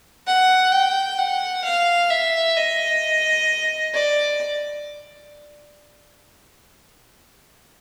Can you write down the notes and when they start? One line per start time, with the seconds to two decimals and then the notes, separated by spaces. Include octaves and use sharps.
0.27 F#5
0.72 G5
1.18 F#5
1.64 F5
2.10 E5
2.56 D#5
3.94 D5